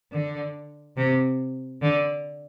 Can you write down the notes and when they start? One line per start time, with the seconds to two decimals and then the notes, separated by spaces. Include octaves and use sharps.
0.12 D3
0.96 C3
1.82 D3